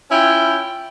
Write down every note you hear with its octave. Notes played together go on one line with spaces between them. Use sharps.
C#4 E4 F4 G5